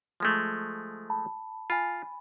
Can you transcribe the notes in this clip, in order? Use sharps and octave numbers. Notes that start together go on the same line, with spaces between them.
F3 G#3 A3
A5 B5
F4 G#5 B5